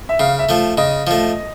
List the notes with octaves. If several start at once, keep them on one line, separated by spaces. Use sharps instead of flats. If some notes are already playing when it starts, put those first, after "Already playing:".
E5
C#3 F5
E5
F3 A3
C#3 D#5
F3 A3